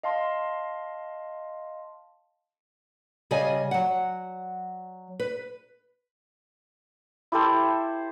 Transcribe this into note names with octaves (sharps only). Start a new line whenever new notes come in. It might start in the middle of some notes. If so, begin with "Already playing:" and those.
D#5 F5 A5 C6
C#3 G3 D5 D#5 G#5
F#3 F#5
B4
E4 G4 A4 C5